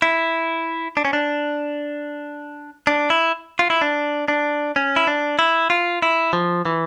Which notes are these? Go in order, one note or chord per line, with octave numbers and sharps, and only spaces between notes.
E4
D4
C#4
D4
D4
E4
F4
E4
D4
D4
C#4
E4
D4
E4
F4
E4
F3
E3